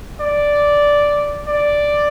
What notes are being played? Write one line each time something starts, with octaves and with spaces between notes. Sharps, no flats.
D5
D5